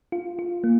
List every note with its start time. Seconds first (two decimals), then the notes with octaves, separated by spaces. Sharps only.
0.12 F4
0.39 F4
0.64 A#3